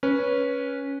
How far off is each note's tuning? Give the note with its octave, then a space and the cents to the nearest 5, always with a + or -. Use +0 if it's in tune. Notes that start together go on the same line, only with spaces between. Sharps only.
C#4 +0 B4 -20